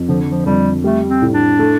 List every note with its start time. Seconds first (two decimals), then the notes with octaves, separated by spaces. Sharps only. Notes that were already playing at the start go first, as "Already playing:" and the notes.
Already playing: F2
0.08 D3 F3
0.31 F3
0.46 F2 G3
0.83 G3 A3
1.09 C4
1.22 A2
1.34 D4
1.59 A3